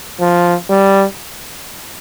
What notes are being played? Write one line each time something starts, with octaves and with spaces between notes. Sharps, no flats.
F3
G3